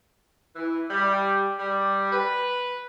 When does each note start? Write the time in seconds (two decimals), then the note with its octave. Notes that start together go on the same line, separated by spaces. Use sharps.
0.56 E3
0.90 G3
1.59 G3
2.12 B4